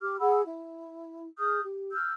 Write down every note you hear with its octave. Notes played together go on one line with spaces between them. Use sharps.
G4 D6 F6
G#4 F#5 B5 E6
E4
G#4 D#6 F6 G6
G4
E6 F6 G6